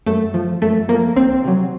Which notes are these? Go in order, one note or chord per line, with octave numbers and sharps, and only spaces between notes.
F#2 A3
F3
F#2 A3
F3 A#3
C2 C4
C3 F#3